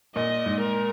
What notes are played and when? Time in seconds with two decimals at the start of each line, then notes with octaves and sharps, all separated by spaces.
0.15 A#2 D#5
0.46 G#2
0.61 A#4